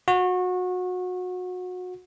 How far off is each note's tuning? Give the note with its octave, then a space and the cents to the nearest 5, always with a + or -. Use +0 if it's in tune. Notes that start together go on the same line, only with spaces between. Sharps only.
F#4 -25